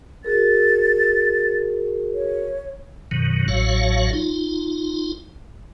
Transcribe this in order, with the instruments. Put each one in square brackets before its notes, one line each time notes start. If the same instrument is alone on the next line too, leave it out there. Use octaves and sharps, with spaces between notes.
[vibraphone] F#4 G#4 A#4 [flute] A6
[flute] C#5
[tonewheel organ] F#2 B2 D#3 F#3
A1 A2 F#3 F#4 C#5 F5
D#4 F4